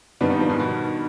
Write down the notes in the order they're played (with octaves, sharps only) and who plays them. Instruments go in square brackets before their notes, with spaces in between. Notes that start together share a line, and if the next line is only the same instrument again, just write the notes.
[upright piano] G2 D#3 G3 B3 [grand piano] D4
[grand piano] D#4
F3
G#2
B2